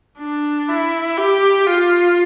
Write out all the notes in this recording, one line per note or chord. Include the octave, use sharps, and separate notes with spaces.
D4
E4
G4
F4